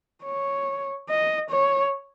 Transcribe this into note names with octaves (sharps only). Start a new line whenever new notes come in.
C#5
D#5
C#5